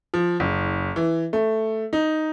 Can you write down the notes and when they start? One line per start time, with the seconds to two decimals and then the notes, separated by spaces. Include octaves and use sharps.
0.14 F3
0.40 F#1
0.96 E3
1.33 A3
1.93 D#4